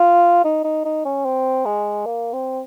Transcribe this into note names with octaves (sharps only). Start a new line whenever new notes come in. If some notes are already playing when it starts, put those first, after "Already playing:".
Already playing: F4
D#4
D#4
D#4
C#4
C4
G#3
A#3
C4